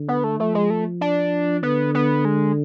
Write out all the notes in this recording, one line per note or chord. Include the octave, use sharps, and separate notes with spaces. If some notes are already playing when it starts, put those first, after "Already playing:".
Already playing: D3
B3
A3
F3 A3
G#3
A3
D4
D3 B3
B3
G#3